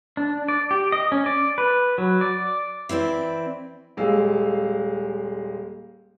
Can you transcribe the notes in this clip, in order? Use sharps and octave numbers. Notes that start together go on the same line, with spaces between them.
D4
D5
G4
D#5
C#4
D5
B4
F#3
D5
E3 C4 E4 D5
D#1 G#3 F5 E6